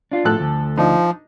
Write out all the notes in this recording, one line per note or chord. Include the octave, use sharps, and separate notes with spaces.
D4 F4
A2 F3 A4 F#6
D2
F3 D4 D#4